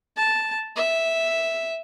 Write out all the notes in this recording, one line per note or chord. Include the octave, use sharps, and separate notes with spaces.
A5
E5